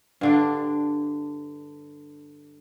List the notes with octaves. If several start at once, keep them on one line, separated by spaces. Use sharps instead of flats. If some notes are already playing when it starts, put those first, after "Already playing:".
G2 D3 D4